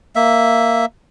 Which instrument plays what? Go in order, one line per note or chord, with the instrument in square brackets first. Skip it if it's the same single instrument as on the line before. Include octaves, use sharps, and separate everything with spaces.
[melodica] A#3 E5